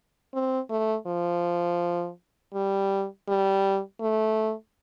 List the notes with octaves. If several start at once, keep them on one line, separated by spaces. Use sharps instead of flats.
C4
A3
F3
G3
G3
A3